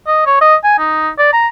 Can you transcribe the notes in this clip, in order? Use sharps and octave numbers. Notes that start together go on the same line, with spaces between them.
D#5
C#5
D#5
G#5
D#4
D5
A#5